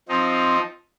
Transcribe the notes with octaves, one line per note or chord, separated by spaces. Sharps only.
F3 C4 D#4